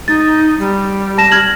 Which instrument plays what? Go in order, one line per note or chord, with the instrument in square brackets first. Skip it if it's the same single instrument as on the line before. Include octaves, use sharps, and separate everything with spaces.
[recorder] D#4 [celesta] A6
[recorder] G3
[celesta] A5 A#6 E7
F6 G#6 F#7